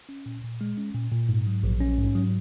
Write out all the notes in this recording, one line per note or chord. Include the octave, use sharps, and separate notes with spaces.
C#4
A#2
A#2
G#3
C#4
A#2
A#2
G#2
F#3
A#1
C#4
G#2
F#3